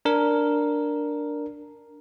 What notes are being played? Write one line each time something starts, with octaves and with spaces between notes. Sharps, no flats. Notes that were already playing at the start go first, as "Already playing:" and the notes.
D4 A#4